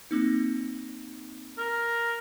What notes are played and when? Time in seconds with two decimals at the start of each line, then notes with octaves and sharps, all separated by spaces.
0.11 A#3 C4 D#4
1.58 A#4